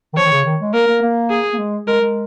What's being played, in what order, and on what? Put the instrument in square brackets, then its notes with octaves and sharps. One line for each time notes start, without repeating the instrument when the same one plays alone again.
[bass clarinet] D#3
[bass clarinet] F3 [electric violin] C#5
[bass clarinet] D#3
C#3
D#3
G#3
[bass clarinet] A#3 [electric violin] A#4
[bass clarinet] A#3
A#3
[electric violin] G#4
[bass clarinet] A#3
G#3
[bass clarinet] G#3 [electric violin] A#4
[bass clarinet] G#3